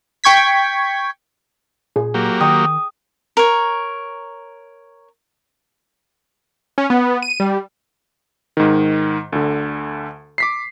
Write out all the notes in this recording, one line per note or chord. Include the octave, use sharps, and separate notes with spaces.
G5 C#6 G#6 B6
A#2 G#4
F#3 A#3 G4
D#3 G5 C#6 D#6
A#4 C#5
C#4
B3
D#7
G3
G#2 D#3
D2 D3
D6 B6 C7